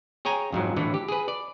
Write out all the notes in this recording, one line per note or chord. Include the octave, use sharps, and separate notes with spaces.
G#4 C#5 G5 G#5 A#5
F2 G#2 F#3
A2 D3 E3
G4
G#4 B4
D5